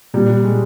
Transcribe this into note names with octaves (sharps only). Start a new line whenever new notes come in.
A#2 G3
A#2
G#3